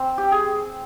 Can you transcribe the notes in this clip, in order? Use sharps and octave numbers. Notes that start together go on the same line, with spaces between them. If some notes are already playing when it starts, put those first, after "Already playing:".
Already playing: C4
G4
G#4